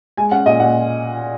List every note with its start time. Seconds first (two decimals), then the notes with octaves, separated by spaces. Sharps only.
0.17 G#3 G#5
0.31 C#4 F#5
0.46 A#2 D#5
0.60 A#2 F#5